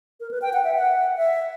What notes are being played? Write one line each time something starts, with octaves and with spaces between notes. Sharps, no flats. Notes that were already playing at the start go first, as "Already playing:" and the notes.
A#4
B4
G5
F#5
E5
F#5
E5